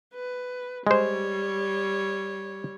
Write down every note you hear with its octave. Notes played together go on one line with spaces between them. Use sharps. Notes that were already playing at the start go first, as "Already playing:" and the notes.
B4
G3 G#3 C5 C#5